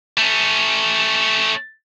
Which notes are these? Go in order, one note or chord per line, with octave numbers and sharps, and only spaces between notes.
A3 C#4